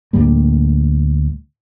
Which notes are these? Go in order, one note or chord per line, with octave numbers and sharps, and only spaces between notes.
D2 A2 G3 A#3